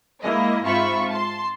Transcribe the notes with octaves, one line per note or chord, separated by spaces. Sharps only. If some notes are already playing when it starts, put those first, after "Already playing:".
G#3 A#3 E4 D#5
G#2 C4 F4 E5 B5 C#6
A5 C6